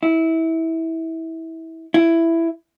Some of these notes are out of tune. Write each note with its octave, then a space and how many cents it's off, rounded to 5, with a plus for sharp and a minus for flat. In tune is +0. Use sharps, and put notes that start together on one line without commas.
E4 -20
E4 +10